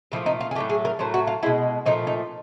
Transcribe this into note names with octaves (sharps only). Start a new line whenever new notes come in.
A#2 F3 A3 E4
D#4
F4
G#4
A2 F#3 A3 G4
G#4
A#4
A2 F#3 A3 C5
F#4
F4
B2 G#3 E4
A#2 F3 A3 D#4
D#4